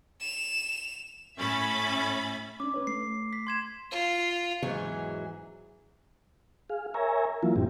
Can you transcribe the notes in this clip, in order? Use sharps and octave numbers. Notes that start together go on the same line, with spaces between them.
E7 F7
A2 C#4 E5 B5 A6
C#4 D4 D6
C#4 B4 C#5
A3 C7
B6
C6 G#6 E7
F4
E2 G#2 E3 F#3 C#4 G#4
G#4 F5
A#4 C#5 E5 G#5 A#5
E3 F#3 A#3 E4 F4
F#2 A2 C4 G4